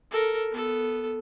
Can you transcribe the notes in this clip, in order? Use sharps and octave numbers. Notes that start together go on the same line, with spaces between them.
A4 A#4
B3 A4